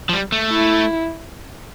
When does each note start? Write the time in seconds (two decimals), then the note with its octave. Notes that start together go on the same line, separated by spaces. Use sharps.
0.09 F3
0.13 G3
0.32 A3
0.51 E4